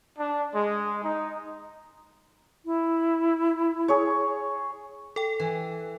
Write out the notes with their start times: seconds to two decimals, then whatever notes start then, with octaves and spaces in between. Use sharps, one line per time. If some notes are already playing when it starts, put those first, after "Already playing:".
0.18 D4
0.55 G#3
1.03 D#4
2.65 E4
3.88 G#4 C#5
5.16 A4 G5
5.40 E3